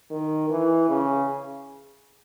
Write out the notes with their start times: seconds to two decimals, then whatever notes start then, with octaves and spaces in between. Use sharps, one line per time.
0.11 D#3
0.50 E3
0.89 C#3